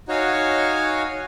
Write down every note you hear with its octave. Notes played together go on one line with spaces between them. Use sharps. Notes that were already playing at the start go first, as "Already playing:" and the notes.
D#4 F#4 C#5 F5 G#5